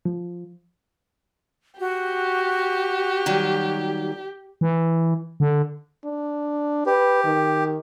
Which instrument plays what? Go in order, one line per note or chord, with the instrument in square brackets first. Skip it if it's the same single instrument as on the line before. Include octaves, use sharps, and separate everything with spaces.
[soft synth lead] F3
[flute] F#4 [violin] G4
[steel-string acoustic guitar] D#3 F#3 G3
[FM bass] E3
D3
[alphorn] D4
[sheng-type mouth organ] G4 [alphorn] B4
[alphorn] D#3